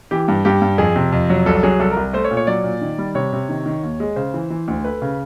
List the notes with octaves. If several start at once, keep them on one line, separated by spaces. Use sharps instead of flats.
E3 G4
G2
G2 G4
G2
F2 G#4
C3
F2
F#3
C2 A4
F#3 G#4
C2 A4
A#4
C2
A3 C5
C#5
A#2
C#5
F#3 D5
A#2
D#3
G3
C3 C#5
C3
D#3
D#3
D#2
G#3
C#3 C5
E3
E3
D2
A3 B4
C#3